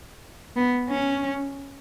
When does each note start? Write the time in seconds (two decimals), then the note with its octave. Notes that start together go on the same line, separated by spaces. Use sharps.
0.56 B3
0.89 C#4